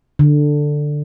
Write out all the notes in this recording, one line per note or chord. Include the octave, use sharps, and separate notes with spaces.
D3